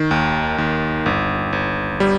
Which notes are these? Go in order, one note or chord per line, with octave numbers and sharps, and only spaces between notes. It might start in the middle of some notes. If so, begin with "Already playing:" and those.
Already playing: D#3
D#2
D#2
G1
G1
G3